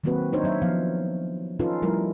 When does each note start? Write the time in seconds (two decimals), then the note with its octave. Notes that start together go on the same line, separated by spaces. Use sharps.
0.04 D#3 F#3 A#3 C4 F#4 B4
0.33 D4 D#4 C5 C#5
0.44 F#3 C#5 E5
0.62 F3 B3 F5
1.59 C#4 D#4 F4 A4 B4
1.82 F3 G3 A3 E4 A#4